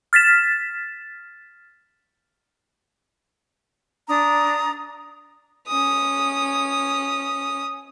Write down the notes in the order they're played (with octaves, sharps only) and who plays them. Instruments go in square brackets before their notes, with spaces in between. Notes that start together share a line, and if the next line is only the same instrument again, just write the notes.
[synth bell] F6 A6 B6 E7
[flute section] D4 A#5 D#6
[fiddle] C#4 D#6